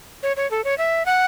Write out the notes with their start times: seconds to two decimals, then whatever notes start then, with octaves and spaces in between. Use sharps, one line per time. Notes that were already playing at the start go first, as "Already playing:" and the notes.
0.23 C#5
0.37 C#5
0.51 A4
0.64 C#5
0.78 E5
1.06 F#5